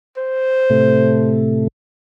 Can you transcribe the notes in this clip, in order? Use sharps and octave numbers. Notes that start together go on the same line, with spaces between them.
C5
A2 C3 A3